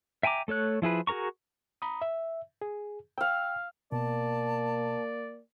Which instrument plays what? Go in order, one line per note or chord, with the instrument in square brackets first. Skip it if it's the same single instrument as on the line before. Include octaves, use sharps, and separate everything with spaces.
[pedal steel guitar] E5 G5 G#5 A#5 D6
A3 A4 C#5 F#6
F3 E4 G#4 B4
F#4 G#4 A#4 A#5 C#6
[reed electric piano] A#5 B5 D#6
E5
G#4
[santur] F5 E6 [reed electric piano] G5 F6
[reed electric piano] B2 [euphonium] A#3 [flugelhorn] D5 [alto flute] A5